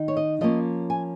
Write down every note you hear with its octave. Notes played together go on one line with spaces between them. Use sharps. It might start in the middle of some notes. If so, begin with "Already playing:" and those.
Already playing: D#3 D#4
C#5
D#5
F3 A#3 C#4 D#5
G#5